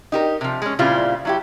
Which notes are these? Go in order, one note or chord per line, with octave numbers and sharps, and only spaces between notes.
D#4 G4 A#4
C3 F3
G#3 C#4
A#2 C#3 G3 C4 E4 F4
F#3 E4 G4